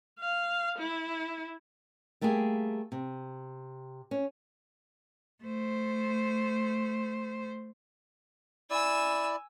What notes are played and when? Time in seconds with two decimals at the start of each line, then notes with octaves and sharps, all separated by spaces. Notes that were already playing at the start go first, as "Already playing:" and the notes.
0.19 F5
0.78 E4
2.21 G3 A3 A#3 G4 G#4
2.92 C3
4.11 C#4
5.44 A3 C5
8.70 E4 D5 G#5 E6